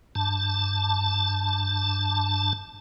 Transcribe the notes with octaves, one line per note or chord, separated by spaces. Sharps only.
G2 A5